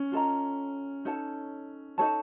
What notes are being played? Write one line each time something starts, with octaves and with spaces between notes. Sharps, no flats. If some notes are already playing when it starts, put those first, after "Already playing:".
Already playing: C#4
F4 A4 D#5 A#5
D#4 A4 C#5 A5
D#4 A4 C#5 A5